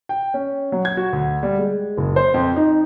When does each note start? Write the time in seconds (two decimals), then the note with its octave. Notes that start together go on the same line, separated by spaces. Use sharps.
0.09 G5
0.34 C#4
0.72 F#3
0.85 G#6
0.97 F#4
1.13 D2
1.43 G3
1.59 G#3
1.97 F#1
2.16 C5
2.34 F2
2.56 D#4